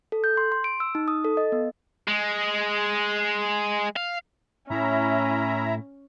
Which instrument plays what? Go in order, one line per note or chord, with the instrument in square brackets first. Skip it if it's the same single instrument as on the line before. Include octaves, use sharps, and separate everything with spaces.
[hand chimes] A4
G6
C6
C6
D7
E6
D#4
D#6
A4
D#5
B3
[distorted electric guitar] G#3
F5
[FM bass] A2 [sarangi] C#4 [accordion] E4 E5 A#5